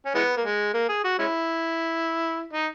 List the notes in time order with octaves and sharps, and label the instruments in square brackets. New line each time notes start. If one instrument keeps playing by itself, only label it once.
[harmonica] C#4
E3 G#3 B3
A#3
G#3
A#3
G#4
F#4
G#3 C#4 E4
D#4